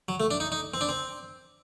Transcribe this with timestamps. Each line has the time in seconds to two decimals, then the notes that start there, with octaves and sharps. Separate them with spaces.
0.08 F#3
0.20 A3
0.31 D4
0.40 D#4
0.52 D#4
0.74 C4
0.81 D4
0.89 C4